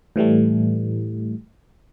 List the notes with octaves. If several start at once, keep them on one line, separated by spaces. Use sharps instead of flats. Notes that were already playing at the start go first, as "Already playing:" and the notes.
A2 E3 G3 A3